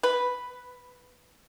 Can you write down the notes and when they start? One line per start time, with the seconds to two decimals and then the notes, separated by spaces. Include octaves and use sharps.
0.03 B4